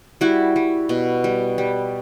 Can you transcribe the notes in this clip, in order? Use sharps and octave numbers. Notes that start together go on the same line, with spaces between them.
G3 E4 F#4
G3
B2
G3
G3